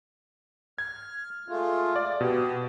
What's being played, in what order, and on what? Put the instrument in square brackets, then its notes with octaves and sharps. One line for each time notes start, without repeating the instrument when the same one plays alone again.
[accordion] F6 [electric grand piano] G#6
[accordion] G#3 A3 F4
[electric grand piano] D5
[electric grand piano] B2 [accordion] G4